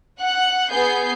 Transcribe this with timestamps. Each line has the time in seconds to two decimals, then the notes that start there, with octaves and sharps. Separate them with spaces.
0.19 F#5 F#6
0.71 B3 G#4 G6 C7